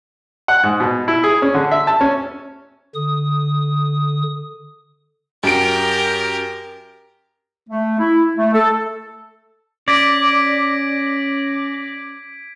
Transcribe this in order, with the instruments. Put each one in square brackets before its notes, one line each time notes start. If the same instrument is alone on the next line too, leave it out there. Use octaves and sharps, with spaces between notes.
[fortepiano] F#5
G#2
B2
E4
G#4
C#4
D3
E5
A5
C#4
[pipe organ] D3 D#6
[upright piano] F#2 D7 [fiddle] G4 A#4
[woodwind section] A3
E4
A3
A4
[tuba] C#4 [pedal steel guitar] D5 [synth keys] D6 A#6 [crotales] G#6 B6 D7